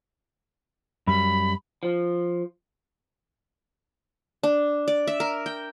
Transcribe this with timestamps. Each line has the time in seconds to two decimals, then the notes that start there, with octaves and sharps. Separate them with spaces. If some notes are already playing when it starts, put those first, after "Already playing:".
1.07 F#2 G3 B5
1.83 F3
4.43 D4
4.88 D5
5.07 E5
5.20 A#4
5.46 G5